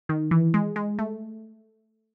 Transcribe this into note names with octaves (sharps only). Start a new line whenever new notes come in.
D#3
E3
G#3
G#3
A3